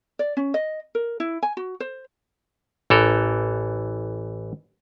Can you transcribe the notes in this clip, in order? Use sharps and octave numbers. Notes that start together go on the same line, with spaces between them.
D5
C#4
D#5
A#4
E4
G#5
F#4
C5
A1 E3 A4 A#4